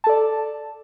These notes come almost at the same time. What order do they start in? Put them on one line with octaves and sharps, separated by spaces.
A5 A4 D5